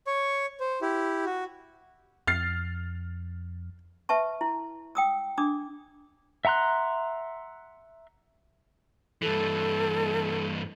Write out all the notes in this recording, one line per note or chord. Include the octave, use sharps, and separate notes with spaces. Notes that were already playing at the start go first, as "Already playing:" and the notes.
C#5 C#6
C5
E4 G4
F#4
F2 F6 A6 C7
B4 E5 A5 C#6
E4
G5 D#6 E6
D4 D6 D#6
E5 F#5 A#5 C6 F#6
G2 E3 A4